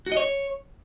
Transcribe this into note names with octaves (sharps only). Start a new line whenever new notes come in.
F#4
D#5
C#5